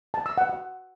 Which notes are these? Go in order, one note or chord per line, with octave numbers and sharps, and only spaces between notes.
A5
E6
F#5
F#5